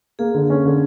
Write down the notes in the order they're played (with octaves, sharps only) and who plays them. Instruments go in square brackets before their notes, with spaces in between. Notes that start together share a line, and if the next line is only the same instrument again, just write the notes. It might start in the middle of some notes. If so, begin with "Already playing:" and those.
[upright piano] A#3 [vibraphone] G#4
[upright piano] D3
C#4
D3